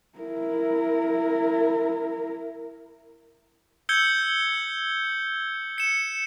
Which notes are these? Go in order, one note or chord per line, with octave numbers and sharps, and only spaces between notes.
E4 A#4
E6 G6 G#6 C#7 G7
C#7 E7